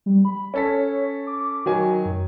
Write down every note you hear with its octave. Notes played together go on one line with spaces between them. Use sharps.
G3
B5
C#4 A4 C#5 B6
D6
D#3 F#3 F#4 G#5
F#2